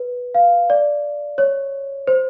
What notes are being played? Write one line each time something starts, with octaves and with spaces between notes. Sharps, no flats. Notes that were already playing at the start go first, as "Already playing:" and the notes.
Already playing: B4
F5
D5
C#5
C5